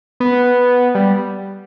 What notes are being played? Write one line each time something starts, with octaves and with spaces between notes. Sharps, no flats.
B3
G3